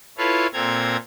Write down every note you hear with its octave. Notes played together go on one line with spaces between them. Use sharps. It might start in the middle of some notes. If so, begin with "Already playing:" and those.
E4 F4 A4 B4 C#5 F5
A#2 C4 A4 A#5 G#6